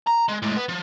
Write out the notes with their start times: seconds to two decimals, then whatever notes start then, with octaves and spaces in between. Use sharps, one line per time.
0.07 A#5
0.28 G#3
0.42 A2 G#3
0.57 B3
0.69 F3